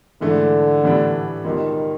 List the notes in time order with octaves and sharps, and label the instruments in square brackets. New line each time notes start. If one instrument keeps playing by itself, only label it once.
[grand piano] G#2 E3 A3 D4 [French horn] D3
[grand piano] A2 E3 G3 B3 D4
[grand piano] C#2 B2 G3 [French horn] D#3